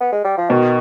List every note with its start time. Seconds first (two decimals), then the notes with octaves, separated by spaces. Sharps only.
0.01 B3
0.12 G#3
0.25 G3
0.38 F3
0.50 B2 D#3